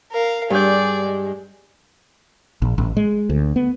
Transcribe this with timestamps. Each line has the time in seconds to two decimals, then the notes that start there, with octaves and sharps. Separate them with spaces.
0.12 A#4 F5
0.50 G2 G#4 D5 G6
1.04 G#3
2.62 A#1
2.78 A1
2.97 G#3
3.30 D2
3.56 B3